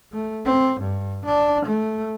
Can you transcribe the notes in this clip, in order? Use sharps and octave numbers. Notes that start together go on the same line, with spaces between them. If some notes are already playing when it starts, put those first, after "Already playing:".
A3
C4
G2
D4
A3